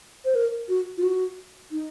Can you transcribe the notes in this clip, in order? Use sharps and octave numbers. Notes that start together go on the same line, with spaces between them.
C5
A#4
F#4
F4
F#4
D#4